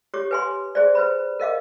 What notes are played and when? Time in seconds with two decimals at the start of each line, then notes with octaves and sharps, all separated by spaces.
0.14 G4 C#5 D6
0.31 B4 G#5 C6
0.75 G#4 C5 D5
0.95 B4 C5 B5
1.40 A#4 D#5 F5 D6